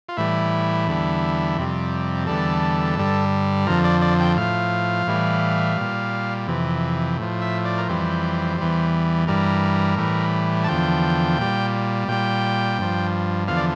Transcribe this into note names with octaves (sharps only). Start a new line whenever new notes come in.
F4
A2 E3 G3 E4
E2 D3 G3
F2 C3 G3
E2 D3 G3 A4
G2 D3 G3
F2 D3 F3 A#4
D5
D5
G5
A2 F3 F5
A2 E3 G3
A#2 G3
F2 C3 E3
A2 F3
E5
D5
A#4
F2 E3 G3 C5
E2 E3 G3
G2 E3 G3 A#4
A2 E3 G3
A5
E2 D3 F3 G5
A#2 G3
A#2 G3 G5
G2 F3
E2 D3 F3 F5
D5